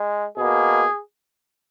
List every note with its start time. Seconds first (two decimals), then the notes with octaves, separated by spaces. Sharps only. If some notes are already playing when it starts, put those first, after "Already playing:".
Already playing: G#3
0.37 B2 A#3 G#4